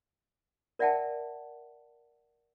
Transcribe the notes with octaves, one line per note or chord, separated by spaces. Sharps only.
A#4 D5 E5 F#5 G5 A5